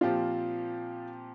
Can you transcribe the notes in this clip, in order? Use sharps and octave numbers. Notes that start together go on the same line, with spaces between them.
A#2 F3 C4 F4 G4